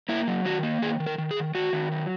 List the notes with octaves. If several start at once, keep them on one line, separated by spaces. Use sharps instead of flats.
A#3 E4
F#3
D#3 F#4
A#3
D#3 G#4
D#3
A#4
D#3
G#4
D#3
D#3 F#4
D#3
F#3